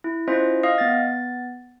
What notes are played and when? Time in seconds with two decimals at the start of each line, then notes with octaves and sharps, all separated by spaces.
0.04 E4
0.28 C#4 E4 F4 C5 D#5
0.63 D#5 F5 D#6
0.78 B3 A6